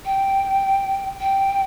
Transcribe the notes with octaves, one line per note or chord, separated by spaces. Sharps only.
G5
G5